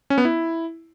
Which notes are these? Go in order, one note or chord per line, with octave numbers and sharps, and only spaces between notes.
C#4
B3
E4